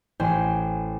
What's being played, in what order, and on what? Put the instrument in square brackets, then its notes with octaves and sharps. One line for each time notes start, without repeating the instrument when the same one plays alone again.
[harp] A1 C5 G5 G#5 C6